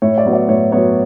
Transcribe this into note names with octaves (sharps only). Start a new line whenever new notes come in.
A2 C#5
D5
F#3 B3
D5
A2 C#5
F#3 B3 C#5